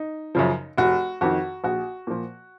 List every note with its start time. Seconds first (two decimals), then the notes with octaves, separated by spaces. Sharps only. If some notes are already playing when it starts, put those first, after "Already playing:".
Already playing: D#4
0.35 F#2 C#3 F3
0.78 F1 F#4
1.21 F2 D#3 F#4
1.64 A#1 F#4
2.07 A#2 F3